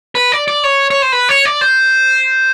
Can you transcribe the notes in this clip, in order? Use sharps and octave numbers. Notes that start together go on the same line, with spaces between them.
B4
D5
D5
C#5
C#5
C5
B4
C#5
D5
C5